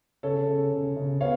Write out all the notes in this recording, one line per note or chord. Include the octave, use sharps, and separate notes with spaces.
C#3 A4 C#5
C#3
C#3
C#3
B3 C#5 F5